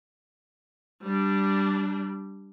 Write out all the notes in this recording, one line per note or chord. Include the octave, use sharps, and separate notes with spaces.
G3 D4